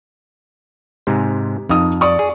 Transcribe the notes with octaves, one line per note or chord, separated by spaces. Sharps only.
G#2 C3 G#3
F2 D#4 D#6
D5 C#6 D#6
G#4